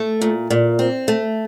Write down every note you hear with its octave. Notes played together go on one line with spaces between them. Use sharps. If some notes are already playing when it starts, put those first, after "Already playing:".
Already playing: A3
A#2
A#2
C4
A3